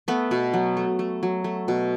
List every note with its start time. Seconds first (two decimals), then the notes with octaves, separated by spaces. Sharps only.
0.08 A3 B3
0.31 B2
0.53 F#3
0.77 A3
0.99 A3
1.23 F#3
1.44 A3
1.68 B2